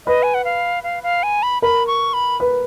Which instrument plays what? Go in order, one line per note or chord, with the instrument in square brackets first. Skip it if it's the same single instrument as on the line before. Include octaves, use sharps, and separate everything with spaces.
[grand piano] B4 [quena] D#5
[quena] G#5
F#5
F5
F5
F5
G#5
B5
[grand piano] A#4 [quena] B5
[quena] C#6
B5
[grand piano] B4